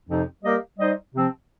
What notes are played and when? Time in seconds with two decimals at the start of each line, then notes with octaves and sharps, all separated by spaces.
0.07 F2 C3 F3 C4 D#4
0.42 G3 A#3 G4 A#4 D#5
0.78 G3 D#4 C5 D#5
1.13 C3 F3 C4